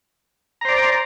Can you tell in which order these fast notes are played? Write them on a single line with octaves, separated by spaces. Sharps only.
A#5 C5 D5